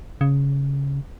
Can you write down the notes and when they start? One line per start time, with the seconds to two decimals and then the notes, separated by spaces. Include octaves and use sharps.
0.21 C#3